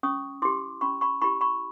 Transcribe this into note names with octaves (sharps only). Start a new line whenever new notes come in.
C#4 C#6 D#6
E4 G4 C6 D6
C#4 B5 C#6
B5 C#6
E4 G4 B5 C#6
B5 C#6